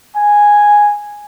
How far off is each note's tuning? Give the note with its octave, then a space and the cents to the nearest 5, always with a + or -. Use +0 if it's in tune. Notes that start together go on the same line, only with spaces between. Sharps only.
G#5 -5